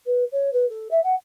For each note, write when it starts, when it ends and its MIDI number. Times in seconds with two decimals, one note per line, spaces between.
0.06 0.24 71
0.32 0.50 73
0.53 0.68 71
0.70 0.88 69
0.91 1.03 76
1.04 1.15 78